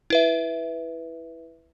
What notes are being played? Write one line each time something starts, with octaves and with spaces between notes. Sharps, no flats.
E4 B4 E5